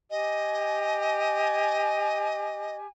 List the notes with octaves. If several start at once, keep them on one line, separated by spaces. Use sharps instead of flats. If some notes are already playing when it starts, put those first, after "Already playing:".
G4 D#5 G#5